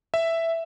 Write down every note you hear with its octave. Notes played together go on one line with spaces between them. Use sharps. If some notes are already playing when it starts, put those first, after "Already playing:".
E5